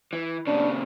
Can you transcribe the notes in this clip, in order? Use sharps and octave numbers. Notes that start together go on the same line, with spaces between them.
E3
A#2 C#3 D4